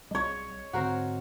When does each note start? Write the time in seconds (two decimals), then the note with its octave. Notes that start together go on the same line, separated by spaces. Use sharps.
0.11 B1 G3 C#5 D#5
0.73 G#2 D3 C4 F#4 A#4 C5